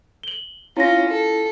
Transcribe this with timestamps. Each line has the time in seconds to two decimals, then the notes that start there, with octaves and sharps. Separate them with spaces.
0.23 F#7 G7
0.77 C#4 E4 F4 A#6
1.09 A4